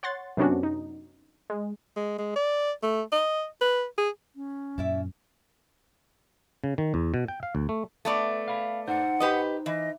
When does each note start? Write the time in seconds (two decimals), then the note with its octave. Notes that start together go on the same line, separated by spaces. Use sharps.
0.03 C#5 F#5 C6 A6
0.37 F#2 C3 B3 C#4 D4 F#4
0.63 D#4
1.50 G#3
1.96 G#3
2.18 G#3
2.36 D5
2.83 A3
3.13 D#5
3.61 B4
3.98 G#4
4.36 C#4
4.78 F#2 A#2 E4 D5 E5
6.64 C#3
6.78 D#3
6.94 E2
7.14 B2
7.28 G5
7.43 F5
7.55 D2
7.69 A3
8.05 A3 B3 D5
8.48 F5 B5
8.88 D#4 C5 F#5
9.20 G4 B4 D#5
9.66 E3 D#5